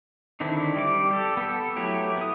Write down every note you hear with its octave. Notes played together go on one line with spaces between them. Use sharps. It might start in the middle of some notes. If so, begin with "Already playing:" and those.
D3 D#3 C4 D4 E4
G3 D6
G4 A4
B3 A4
F#3 A3 E4 G4
B3 D#6